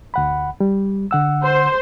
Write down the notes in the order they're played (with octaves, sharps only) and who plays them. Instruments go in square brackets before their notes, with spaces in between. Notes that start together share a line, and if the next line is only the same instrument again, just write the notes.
[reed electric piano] D2 F#5 B5
G3
D3 F#5 E6
[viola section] C5